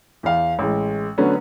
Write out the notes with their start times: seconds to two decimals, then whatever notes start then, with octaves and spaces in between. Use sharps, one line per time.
0.23 E2 F5
0.59 A1 G#3
1.18 D3 F#3 A3 B3 C#4